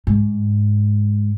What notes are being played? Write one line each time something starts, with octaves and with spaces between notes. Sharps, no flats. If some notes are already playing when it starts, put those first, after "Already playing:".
G#2